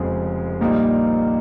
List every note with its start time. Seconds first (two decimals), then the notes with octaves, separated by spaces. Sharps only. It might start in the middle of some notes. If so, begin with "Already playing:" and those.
Already playing: F1 F2 C#3 F3 G#3
0.61 A#1 A#2 G3 A#3 D#4